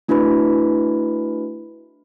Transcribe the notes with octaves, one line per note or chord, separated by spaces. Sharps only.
A3 D4 E4 F#4 B4 B5